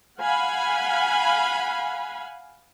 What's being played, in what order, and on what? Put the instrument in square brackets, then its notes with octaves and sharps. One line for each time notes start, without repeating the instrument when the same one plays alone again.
[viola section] F5 F#5 G#5 B5